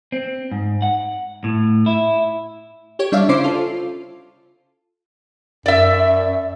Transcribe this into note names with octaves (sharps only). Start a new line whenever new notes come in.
C4
G#2
F#5
A2
E4
G4 C#5
G3 D4 C#5 D5 E5 F5
C#3 C#4 E4 C5 D6 C7
F4 A4
F#2 D5 E5